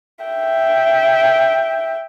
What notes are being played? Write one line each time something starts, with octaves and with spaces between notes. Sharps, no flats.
E5 G5